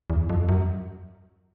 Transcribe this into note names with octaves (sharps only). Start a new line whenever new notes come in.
E2
F2
F#2